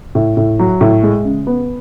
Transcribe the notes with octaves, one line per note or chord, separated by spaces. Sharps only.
A2
A2
F#3
A2
G#3
C#3
B3